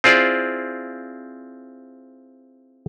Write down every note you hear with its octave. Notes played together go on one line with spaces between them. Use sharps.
C4 E4 F4 G#4 C5 D5